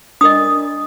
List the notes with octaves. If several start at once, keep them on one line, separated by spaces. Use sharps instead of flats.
D4 A#4 D#5 D#6